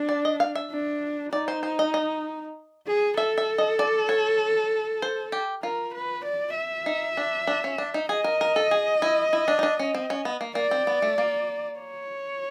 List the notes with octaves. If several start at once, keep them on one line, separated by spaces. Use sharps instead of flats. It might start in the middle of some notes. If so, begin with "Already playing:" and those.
Already playing: D4
D5
D#5
F5
E5
D4
D#4 D5
C5
C5
D#5
D#5
G#4
A4 E5
E5
D#5
D5
C#5
C5
G4
F4 A#4
B4
D5
E5
D#4
D4
D4
C#4
D4
D#4
G#4 D#5
A#4
A#4
A4
G#4
E4
E4
D4
D#4
D4
C#4
C4
C#4
B3
A#3
A#3 D5
C4
B3
A3
A#3
C#5